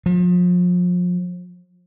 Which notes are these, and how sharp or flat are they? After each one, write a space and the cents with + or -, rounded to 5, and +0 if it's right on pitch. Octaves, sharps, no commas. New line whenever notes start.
F3 +35